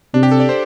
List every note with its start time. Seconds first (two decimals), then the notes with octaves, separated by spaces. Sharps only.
0.14 C3 D4
0.23 G4
0.32 A4
0.40 D5
0.49 C5